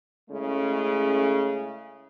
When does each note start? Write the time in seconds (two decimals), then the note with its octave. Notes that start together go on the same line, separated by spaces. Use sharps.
0.30 C#3 G#3 A3 C#4 E4